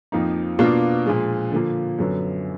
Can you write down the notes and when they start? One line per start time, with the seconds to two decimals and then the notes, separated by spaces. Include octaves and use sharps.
0.12 F2 F3 A#3 D#4
0.59 B2 A#3 D4 F4
1.06 A#2 F3 G#3
1.52 D3 F3 A#3
1.98 F#2 D3 F#3 B3